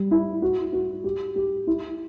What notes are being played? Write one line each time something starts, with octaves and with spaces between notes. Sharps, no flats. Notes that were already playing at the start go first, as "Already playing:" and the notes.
Already playing: G3
E4
F#4
F#4
G4
G4
E4